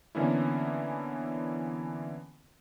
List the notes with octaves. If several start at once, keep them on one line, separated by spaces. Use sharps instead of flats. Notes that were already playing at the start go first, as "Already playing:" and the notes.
D3 E3 A#3 B3 C#4 E4